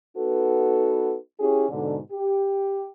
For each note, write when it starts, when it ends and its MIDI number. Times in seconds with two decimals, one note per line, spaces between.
0.16 1.15 59
0.16 1.15 63
0.16 1.15 66
0.16 1.15 69
0.16 1.15 71
1.40 1.69 61
1.40 1.69 64
1.40 1.69 67
1.40 1.69 68
1.69 1.98 44
1.69 1.98 47
1.69 1.98 50
2.12 2.90 67